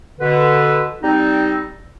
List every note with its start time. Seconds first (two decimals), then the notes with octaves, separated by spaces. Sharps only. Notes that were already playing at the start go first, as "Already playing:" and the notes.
0.20 B2 D3 B4
1.02 G3 C4 D#4